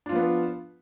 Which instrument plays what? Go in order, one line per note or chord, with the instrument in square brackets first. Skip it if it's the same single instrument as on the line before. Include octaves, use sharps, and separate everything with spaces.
[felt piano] D4
F4
F3
B3